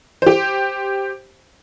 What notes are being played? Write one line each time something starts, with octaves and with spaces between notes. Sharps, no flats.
G4 C5